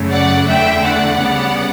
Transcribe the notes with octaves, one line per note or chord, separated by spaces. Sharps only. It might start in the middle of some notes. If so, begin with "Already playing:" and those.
Already playing: F#2 C#3 F#3 A3
D5 F#5
E2 D3 A3 E5 G5
D5 F#5
D2 C#3 G3 B3